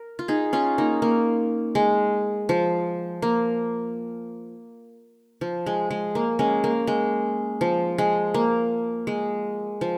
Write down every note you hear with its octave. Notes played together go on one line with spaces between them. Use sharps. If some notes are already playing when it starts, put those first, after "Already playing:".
Already playing: A#4
F4
D#4 G#4
C#4 F4
A#3 D#4
A#3
G#3
F3
A#3
F3
G#3
G#3
A#3
G#3 C#4
A#3
G#3
F3
G#3
A#3
G#3
F3